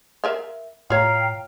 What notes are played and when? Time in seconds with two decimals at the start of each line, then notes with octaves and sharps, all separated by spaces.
0.24 A#4 E5 F5
0.90 A2 F4 C#5 F5 G5 A#5